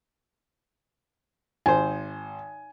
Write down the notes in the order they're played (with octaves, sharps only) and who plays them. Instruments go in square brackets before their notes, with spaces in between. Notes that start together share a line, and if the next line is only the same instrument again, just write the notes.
[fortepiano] G#1 C5 [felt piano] G#5